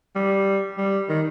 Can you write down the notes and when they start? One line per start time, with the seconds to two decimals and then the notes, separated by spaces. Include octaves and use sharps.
0.16 G3
0.77 G3
1.09 D#3